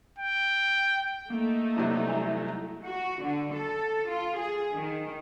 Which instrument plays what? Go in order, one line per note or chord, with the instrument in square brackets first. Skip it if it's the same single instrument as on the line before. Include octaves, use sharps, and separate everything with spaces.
[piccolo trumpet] G5
[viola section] A3 D#4 [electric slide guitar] A#3
[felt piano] G2 C3 F#3 [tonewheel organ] E4
[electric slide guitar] E2 G#5 A#5
[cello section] F#4
D3
A4
F4
G#4
D#3